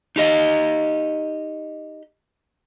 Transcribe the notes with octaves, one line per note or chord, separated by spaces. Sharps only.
D#4 G4 D#5